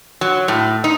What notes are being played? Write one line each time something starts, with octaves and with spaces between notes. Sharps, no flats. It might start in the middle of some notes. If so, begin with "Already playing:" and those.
F#3
A2
D#4